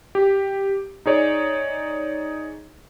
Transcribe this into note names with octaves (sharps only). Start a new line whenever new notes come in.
G4
D#4 G#4 C#5 D5